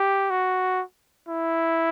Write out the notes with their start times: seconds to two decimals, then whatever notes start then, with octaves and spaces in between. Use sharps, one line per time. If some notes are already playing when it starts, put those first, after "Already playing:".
Already playing: G4
0.30 F#4
1.28 E4